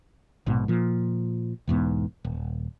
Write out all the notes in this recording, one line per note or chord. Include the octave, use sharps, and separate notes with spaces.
A#1 G#2 B2
A#2 F3
B1 E2 G#2 B3
D#1